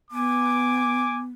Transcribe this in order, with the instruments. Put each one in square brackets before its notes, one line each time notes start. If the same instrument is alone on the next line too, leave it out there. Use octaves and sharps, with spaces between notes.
[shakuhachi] B3 [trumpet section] G#5 D6